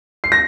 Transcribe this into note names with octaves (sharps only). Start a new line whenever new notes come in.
C7
A#6